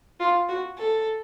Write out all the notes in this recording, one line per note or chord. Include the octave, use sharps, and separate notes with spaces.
F4
F#4
A4